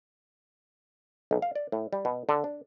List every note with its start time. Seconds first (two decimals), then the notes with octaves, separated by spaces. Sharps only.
1.31 B1
1.42 F5
1.55 D5
1.72 A2
1.93 G3
2.05 B2
2.29 D3
2.44 D4